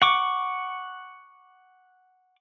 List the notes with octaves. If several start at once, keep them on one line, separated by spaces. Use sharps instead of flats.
F#5 C#6 D6